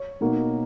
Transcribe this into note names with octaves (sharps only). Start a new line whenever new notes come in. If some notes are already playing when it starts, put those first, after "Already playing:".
Already playing: C#5
B2 A#3 D#4